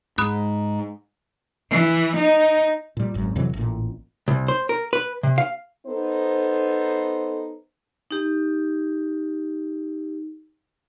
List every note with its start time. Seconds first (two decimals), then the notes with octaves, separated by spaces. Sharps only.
0.18 G#2 B5 D#6 F#6
1.70 E3
2.16 D#4
2.97 A#2 G3
3.14 G#1 F#2
3.36 F2 C3 E3 F#3
3.53 A1 A#2
4.28 C2
4.48 C5
4.69 A#4
4.93 B4
5.23 C3
5.38 F5
5.87 B3 D#4 A4 C5
8.11 D#4 G4